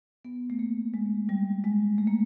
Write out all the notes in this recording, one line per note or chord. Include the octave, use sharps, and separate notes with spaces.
B3
A3
A#3
G#3
G3
G#3
A3
A#3